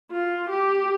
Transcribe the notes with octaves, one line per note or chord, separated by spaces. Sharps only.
F4
G4